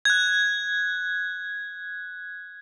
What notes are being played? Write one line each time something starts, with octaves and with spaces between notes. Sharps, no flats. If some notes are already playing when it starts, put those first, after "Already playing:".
F#6 G#6